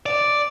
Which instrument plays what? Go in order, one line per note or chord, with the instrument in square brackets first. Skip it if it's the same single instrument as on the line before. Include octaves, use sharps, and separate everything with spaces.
[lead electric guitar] D5